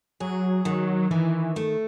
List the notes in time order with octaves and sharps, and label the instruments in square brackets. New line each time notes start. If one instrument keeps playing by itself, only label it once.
[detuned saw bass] F#3 [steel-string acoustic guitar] G#4
[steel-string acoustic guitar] D#3 [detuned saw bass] F#3
[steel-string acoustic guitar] D#3 [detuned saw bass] E3
[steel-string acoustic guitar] A3